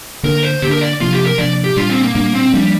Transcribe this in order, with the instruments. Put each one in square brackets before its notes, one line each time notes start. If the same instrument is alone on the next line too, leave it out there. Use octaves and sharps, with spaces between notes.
[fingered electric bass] D3 A#3 D4 [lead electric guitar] A#4
[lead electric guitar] C5
[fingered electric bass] D3 A#3 D4 [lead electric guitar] G4
[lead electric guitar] A#4
D5
[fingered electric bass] C3 F3 A#3 D4 [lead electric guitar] F4
[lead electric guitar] G4
A#4
[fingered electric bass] C3 F3 A#3 D4 [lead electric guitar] D5
[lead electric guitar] G4
[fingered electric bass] A#2 G3 D4 [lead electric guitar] F4
[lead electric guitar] C4
A#3
[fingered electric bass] A#2 G3 D4 [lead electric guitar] A#3
[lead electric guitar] C4
[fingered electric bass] F3 A#3 D4 [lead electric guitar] G3